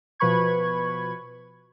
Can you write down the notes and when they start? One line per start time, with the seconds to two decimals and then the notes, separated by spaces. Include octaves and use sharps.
0.20 B2 F3 B4 B5 C#6 G#6